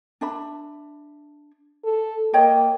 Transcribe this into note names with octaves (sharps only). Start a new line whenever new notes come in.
D4 E5 B5
A4
A#3 C#5 D#5 G5